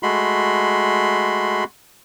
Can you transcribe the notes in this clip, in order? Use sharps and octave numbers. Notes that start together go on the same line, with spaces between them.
G#3 A3 F#4 B5 C6